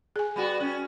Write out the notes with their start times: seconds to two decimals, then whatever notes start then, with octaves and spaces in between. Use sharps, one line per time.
0.16 G#4 G#5
0.36 G3 B3 F#4
0.60 C#4